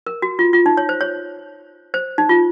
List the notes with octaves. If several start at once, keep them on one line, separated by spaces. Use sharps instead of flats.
A#4
F#4
F4
F4
D#4
C#5
C5
C#5
C5
D#4
F4